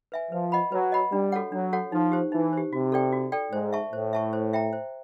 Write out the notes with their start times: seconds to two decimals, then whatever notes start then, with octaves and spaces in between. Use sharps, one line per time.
0.12 B4 E5 G#5
0.31 F3 B4
0.52 D#5 F#5 B5
0.72 F#3 B4
0.92 D#5 F#5 B5
1.12 G3 D4
1.32 F#4 A4 C#5 F#5
1.52 F#3 D4
1.73 F#4 A4 C#5 F#5
1.92 F3 D#4
2.12 G4 C5
2.32 E3 D#4
2.53 G4 C5
2.72 C3 F#4
2.92 A4 D5 G5
3.12 F#4
3.32 A4 D5 G5
3.52 G#2 C5
3.73 E5 A5 C#6
3.93 A2 C5
4.13 E5 A5 C#6
4.33 C5
4.53 E5 G5 A#5
4.73 C5